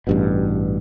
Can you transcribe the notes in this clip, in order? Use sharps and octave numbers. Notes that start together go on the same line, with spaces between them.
A1 G2 B2